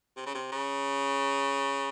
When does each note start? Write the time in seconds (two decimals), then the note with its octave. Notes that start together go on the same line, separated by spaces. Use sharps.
0.17 C3
0.26 C#3
0.34 C3
0.52 C#3